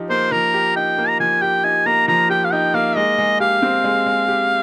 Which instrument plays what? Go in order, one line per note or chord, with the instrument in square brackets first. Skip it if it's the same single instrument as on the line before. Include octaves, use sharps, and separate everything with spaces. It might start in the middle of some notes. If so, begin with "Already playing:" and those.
Already playing: [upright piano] F3 D#4 G4
[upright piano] A#3 [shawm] C5
[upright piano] F3 [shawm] A#4
[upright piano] G4
[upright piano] D#4 [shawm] G5
[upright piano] A#3
[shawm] A#5
[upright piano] F3 [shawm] G#5
[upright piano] G4 [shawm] G5
[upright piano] D#4 [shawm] G#5
[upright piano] A#3 [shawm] A#5
[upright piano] F3 [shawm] A#5
[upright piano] G4 [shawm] G5
[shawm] F5
[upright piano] D#4 [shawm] G5
[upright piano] A#3 [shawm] F5
[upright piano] G#3 [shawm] D#5
[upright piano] G#3
[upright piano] G4 [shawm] F5
[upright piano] C4
G#3
G#3
G4